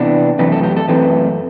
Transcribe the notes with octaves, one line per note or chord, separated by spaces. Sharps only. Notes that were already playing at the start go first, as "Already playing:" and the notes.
Already playing: C3 E3 B3 D4
F#2 E3 A3 C4 B4
A4
G4
A4
F#2 E3 A3 C4 B4